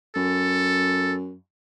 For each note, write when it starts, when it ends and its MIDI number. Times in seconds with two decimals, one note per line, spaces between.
0.16 1.34 42
0.16 1.15 69